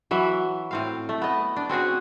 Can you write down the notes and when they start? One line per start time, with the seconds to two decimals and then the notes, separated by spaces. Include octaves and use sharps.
0.11 E3 F#3 E5
0.71 A2 C4 F5
1.09 A3
1.22 B3 D#5
1.56 D4
1.69 C4 C#4 F#4 G#4